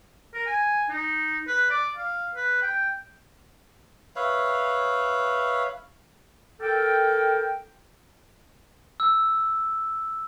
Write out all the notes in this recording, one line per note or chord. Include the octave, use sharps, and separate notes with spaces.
A#4
G#5
D#4
B4
D5
F5
B4
G5
B4 C#5 E5 F5
A4 A#4 G5
E6